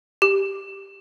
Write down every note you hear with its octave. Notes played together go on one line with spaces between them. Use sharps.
G4